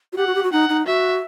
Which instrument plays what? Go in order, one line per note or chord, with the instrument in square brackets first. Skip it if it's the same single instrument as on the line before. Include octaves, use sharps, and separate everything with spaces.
[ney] F#4
[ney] G4 [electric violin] F#5
[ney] F#4
G4
F#4
[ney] D#4 [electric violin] F#5
[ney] D#4
[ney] F#4 [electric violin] E5